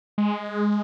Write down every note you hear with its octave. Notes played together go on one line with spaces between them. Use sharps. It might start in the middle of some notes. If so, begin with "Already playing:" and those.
G#3